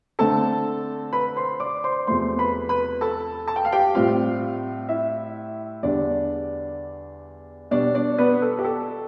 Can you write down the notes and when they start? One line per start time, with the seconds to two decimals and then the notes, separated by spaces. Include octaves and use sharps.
0.19 D3 A3 C4 A4 A5
1.13 B4 B5
1.36 C5 C6
1.60 D5 D6
1.84 C5 C6
2.07 E2 C3 F3 A3 C5 C6
2.38 B4 B5
2.69 B4 B5
3.01 A4 A5
3.48 A5
3.56 G5
3.65 F5
3.73 G4 G5
3.95 A2 G3 C4 F4 F5
4.89 E4 E5
5.83 E2 D3 G3 D4 D5
7.71 B2 G3 D4 D5
7.94 D4 D5
8.18 B3 B4
8.42 A4
8.59 G4
8.64 A4